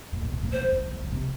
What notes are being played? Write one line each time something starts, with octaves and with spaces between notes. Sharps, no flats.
A#2
B2
B2
A2
B2 C5
D3
D#3
E3
D#3
C#3
C3